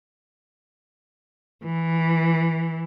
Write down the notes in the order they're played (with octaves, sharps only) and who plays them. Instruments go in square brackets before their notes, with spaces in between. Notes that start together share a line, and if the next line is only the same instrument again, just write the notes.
[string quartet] E3